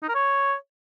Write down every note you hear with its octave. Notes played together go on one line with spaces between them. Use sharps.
D#4
A#4
C#5